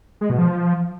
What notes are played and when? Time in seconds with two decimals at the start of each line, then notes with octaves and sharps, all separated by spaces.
0.21 G#3
0.30 B2
0.38 F3